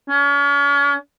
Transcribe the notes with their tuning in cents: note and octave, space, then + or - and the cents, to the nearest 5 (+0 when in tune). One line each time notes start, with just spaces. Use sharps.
C#4 +40